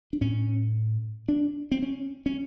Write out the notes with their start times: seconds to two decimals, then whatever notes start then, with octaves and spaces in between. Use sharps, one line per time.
0.13 D4
0.21 A2 C#4
1.28 D4
1.72 C4
1.82 C#4
2.26 C#4